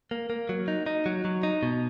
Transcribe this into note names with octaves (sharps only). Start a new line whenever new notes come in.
A#3
A#3
F#3
D#4
D#4
F#3
F#3
D#4
B2